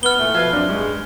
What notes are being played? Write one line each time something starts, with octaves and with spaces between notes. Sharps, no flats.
B3 F6 G7
A#2 E3 A3
B2 F3 B4 E5 F5 G#6
F#2 C4 D4
G2 G#3